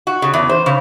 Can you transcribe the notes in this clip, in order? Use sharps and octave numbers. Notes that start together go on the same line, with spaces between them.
F#4
C#3
E2
C5
C#3